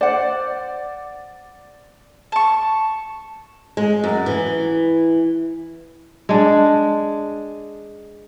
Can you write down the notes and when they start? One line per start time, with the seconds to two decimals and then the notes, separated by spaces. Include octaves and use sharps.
0.01 C5 D5 F#5
2.32 A5 C#6
3.77 G#3
4.04 F#2
4.26 E3
6.29 G#3 D4